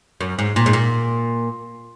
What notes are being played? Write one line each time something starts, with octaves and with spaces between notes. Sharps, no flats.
F#2
G#2
A#2
G#2
A#2